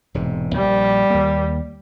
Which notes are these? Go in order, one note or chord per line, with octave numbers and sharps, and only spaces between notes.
E1 G#2 C3
A#1 G3
D#2 A#3